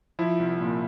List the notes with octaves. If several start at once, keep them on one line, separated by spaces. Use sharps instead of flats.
F3 E4
C2
A#2